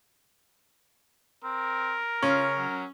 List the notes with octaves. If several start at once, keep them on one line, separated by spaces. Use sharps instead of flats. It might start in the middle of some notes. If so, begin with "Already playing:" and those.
C4 A#4
C#3 C#4 F4
F#3